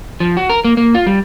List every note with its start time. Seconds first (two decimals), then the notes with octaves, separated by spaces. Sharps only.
0.20 F3
0.37 F#4
0.49 A#4
0.64 A#3
0.77 A#3
0.95 F4
1.07 G3